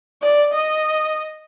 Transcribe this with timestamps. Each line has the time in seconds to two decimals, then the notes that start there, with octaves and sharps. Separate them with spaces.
0.22 D5
0.53 D#5